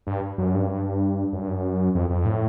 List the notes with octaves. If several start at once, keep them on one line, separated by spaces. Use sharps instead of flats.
G2
F#2
G2
F#2
G2
F#2
F2
F2
A2